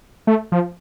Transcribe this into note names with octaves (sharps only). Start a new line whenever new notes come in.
A3
F3